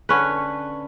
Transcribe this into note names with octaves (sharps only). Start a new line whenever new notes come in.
D3 C#4 B4